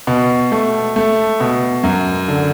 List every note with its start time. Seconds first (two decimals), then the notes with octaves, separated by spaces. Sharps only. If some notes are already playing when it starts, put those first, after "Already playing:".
0.07 B2
0.52 A3
0.96 A3
1.40 B2
1.83 F#2
2.28 D3